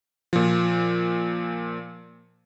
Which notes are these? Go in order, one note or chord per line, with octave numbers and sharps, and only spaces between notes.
A#2 F3